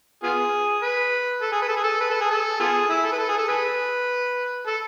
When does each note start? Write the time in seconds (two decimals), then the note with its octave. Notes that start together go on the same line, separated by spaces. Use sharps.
0.23 B3 F4 G#4
0.83 B4
1.42 A4
1.52 G#4
1.62 B4
1.69 A4
1.77 G#4
1.84 A4
2.00 B4
2.10 A4
2.21 G#4
2.30 A4
2.60 B3 F4 G#4
2.90 E4
3.04 A4
3.13 B4
3.19 A4
3.29 G#4
3.38 A4
3.49 G#4 B4
4.67 A4